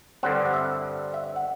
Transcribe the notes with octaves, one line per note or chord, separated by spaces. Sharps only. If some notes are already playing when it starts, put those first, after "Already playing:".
G2 D3 G3 C4 F#5
F#5
E5
E5
F#5